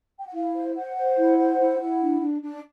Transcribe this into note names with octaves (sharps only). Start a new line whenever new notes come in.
G5
F#5
E4 F5
C5
C5 F#5
C5
E4
C5
E4
E4
D4
D4
D4